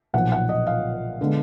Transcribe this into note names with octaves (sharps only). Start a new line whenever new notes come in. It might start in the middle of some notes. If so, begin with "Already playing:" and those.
B1 A#2 F3 F#5
F#5
D#5
F5
D3 G#3 B3